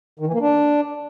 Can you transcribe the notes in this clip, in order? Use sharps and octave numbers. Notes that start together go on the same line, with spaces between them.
D#3
E3
A#3
D4